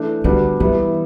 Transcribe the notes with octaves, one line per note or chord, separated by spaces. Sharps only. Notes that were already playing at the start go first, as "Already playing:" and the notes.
Already playing: E3 A3 D4
D3 G3 B3 D4 F#4
E3 G3 B3 E4